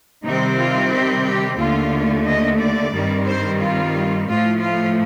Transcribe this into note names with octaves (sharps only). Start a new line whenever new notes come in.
C3 D#3 G3 C4 D#4
F4
G4
G4
D#2 D3 A3 F4
D#5
D5
G2 D#3 G3 C4
C5
F4
A2 F3 A3 F4
F4